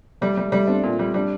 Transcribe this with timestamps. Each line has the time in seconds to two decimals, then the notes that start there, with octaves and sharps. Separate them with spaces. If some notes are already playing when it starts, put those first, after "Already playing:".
0.21 G3 A3
0.37 G3 A3
0.52 G3 A3
0.68 C4 D4
0.83 A#2
0.99 G3
1.14 G3 D4